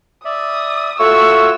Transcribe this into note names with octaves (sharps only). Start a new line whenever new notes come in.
D5 E5 D#6
A3 F4 F#4 C#5 C#6 E6